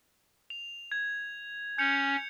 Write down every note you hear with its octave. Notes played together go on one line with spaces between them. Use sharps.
F7
G#6
C#4 G6 C#7 F7